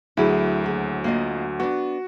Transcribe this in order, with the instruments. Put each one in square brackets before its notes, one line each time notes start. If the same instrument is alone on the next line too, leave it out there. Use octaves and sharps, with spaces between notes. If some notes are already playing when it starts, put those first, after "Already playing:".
[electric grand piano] D2 F#3 [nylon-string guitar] E4 G#4
[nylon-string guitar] D#2 G#4
A#3 F4 D#5
[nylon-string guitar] B3 D4 [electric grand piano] F#4